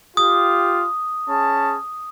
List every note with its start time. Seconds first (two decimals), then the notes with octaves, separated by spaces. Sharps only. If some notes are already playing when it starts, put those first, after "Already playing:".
0.17 F4 G4 D#6
1.29 C#4 G#4 A5